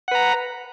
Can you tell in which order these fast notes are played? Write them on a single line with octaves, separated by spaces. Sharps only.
F#5 B4 A#5